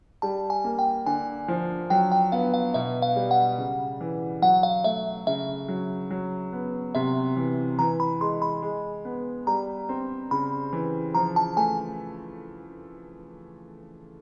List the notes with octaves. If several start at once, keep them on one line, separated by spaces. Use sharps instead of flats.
G3 A5
G#5
A#3
G5
D3 G#5
F3
F#3 G5
G5
B3 F5
F5
B2 E5
F5
G3
F#5
C#3
E3
F#3 F#5
F5
A3 E5
C#3 E5
F#3
F#3
B3
C3 E5
E3
E3 A#5
B5
G#3 C6
B5
G#3
B3
G3 A#5
C4
C#3 B5
E3
F3 A#5
A5
A3 G#5